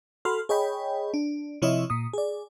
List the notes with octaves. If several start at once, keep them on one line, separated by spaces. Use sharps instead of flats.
F#4 A4 B5 C6 F6
G#4 C#5 D#5 G5 B5
D4
C3 F3 E4 C#5 D#5 E5
A#2 D#6
G#4 D5